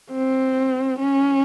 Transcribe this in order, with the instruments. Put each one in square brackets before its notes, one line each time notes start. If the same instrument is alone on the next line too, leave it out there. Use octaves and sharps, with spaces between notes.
[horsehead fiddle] C4
C#4